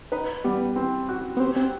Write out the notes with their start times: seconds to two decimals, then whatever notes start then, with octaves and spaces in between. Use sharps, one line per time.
0.12 D#4 B4
0.44 G3 B3
0.76 C4
1.09 F#4
1.37 B3
1.40 C4 G4
1.56 C4